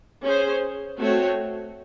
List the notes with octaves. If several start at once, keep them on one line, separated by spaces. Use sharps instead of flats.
C#4 G#4 C5
A3 C4 F#4 C#5